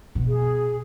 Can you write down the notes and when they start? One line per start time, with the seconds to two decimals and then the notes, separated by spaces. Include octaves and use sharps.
0.15 B2
0.28 G#4